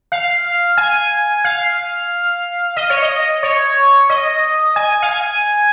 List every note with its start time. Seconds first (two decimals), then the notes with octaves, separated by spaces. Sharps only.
0.12 F5
0.78 G#5
1.44 F5
2.76 D#5
2.90 C#5
3.02 D#5
3.43 C#5
4.10 D#5
4.76 G#5
5.03 F5
5.09 G#5